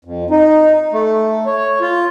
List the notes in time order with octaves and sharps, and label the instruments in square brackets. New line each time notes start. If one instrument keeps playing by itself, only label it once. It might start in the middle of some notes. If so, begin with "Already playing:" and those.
[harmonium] F2
D#4
A3
C#5
F4